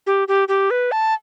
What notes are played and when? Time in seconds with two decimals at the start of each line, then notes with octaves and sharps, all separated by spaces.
0.07 G4
0.28 G4
0.48 G4
0.71 B4
0.92 A5